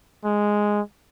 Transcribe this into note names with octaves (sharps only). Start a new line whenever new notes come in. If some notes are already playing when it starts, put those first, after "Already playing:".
G#3